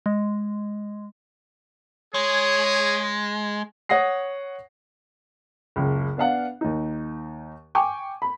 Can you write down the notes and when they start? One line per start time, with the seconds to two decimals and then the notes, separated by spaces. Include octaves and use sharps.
0.06 G#3
2.14 G#3 G#4 C#5
3.89 C#5 F#5 D#6 A#6 C7
5.76 F#1 C#2
6.17 B3 D4 F5 F#5
6.61 D#2 D#4
7.75 G5 G#5 C#6 D6
8.22 B5